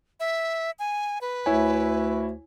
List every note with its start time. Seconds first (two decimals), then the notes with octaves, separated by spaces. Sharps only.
0.20 E5
0.79 G#5
1.21 B4
1.46 D2 E4 C#5 G#5